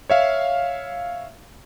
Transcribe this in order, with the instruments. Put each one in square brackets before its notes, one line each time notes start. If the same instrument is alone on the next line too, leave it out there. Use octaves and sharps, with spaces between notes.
[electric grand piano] C#5 E5 F5